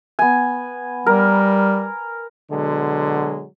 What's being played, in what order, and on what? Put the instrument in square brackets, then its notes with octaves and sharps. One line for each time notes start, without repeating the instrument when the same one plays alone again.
[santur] B3 G#5
[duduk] G3 [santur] A#4
[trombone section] B2 D3 F#3 G#3